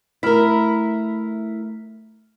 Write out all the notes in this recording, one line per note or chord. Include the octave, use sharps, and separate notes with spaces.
A3 E4 A#4 F6 B6